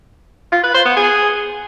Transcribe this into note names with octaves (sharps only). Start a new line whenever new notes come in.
F4
B4
C5
B3
G#4